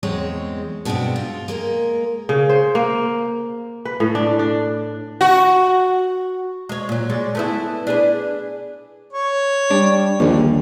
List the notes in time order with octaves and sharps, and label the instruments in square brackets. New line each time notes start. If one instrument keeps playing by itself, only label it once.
[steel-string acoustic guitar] E2 G#3 C4 C#5
G2 B2 G#3 A3 B3 C4
F4
G#3 A#3 A#4
[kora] C#3
C5
A#3
B4
A2
D4
D4
[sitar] F#4
[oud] G#3 C#5
A#2 F#3
G#3 C#5 D5
A3 B3 E4
D4 G#4 B4
[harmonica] C#5
[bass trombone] G3 [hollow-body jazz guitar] D4
[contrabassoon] A#1 [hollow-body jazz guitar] D#2 D3